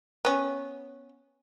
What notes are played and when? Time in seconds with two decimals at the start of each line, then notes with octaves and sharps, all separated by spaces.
0.25 B3 C#4